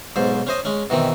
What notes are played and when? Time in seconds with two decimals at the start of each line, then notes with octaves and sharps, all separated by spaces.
0.16 B1 G#2 C5
0.47 C#4 C5 D#5
0.65 G#3 C#4
0.90 B2 D#3 E3 C4